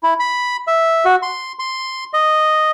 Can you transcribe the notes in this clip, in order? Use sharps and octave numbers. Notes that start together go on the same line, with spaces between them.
E4
B5
E5
F#4
C6
C6
D#5